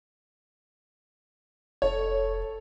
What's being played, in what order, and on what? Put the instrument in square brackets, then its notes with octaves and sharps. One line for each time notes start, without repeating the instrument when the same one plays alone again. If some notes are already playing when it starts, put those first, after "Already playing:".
[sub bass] F1 [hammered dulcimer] A4 [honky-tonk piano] C#5